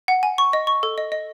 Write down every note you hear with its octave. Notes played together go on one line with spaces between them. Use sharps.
F#5
G#5
C#6
D#5
C#6
A4
D#5
D#5